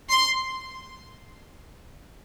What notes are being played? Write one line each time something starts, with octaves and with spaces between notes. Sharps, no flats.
C6